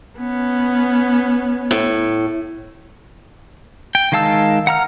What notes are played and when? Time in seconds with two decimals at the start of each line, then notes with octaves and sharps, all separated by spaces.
0.18 B3 C#4
1.71 A2
3.95 G5
4.12 D#3 G#3 F5 A5 E6
4.67 F#5 A#5 F6